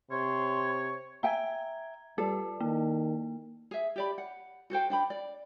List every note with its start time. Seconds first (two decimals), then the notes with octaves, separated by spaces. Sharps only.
0.11 C3 C#5 C6
1.23 E5 G5 G#5 A#5 G#6
2.18 G3 F4 A4 D5
2.60 D#3 A#3
3.71 G#4 E5
3.96 G4 D5 B5
4.18 F#5
4.70 F#4 A4 C5 G5
4.90 D4 G5 B5
5.10 D5